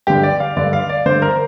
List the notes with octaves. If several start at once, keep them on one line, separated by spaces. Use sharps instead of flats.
G2 D3 G4
D5
F5
G2 D3 D5
F5
D5
G2 D3 C5
A#4